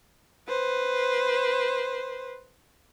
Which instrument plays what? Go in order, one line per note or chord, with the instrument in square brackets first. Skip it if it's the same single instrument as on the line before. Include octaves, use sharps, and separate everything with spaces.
[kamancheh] B4 C5